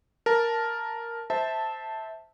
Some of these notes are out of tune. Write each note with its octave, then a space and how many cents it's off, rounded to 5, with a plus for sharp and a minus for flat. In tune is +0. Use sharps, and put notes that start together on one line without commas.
A#4 +0 A5 +0
C5 -5 E5 -20 A5 +0